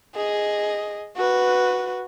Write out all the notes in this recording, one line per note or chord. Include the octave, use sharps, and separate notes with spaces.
G#4 D#5
F#4 B4